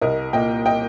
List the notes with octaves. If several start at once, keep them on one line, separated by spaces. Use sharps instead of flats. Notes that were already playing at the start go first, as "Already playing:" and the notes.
C2 A#4 D#5
A#2 A#3 D#5 G5
D#5 G5